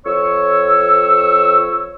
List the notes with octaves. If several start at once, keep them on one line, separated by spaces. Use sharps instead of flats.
F2 C#5 C#6 E6